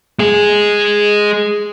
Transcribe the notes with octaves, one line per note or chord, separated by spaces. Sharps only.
G#3 G#4